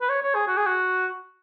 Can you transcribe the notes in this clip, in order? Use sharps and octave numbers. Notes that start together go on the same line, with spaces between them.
B4
C#5
C#5
G#4
F#4
G#4
F#4